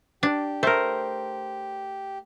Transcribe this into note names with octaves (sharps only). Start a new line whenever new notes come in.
D4 G4
A3 A#4 C5